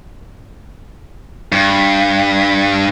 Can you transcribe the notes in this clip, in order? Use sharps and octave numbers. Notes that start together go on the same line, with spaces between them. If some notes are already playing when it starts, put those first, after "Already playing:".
G2